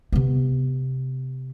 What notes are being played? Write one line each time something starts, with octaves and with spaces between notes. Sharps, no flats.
C3 B3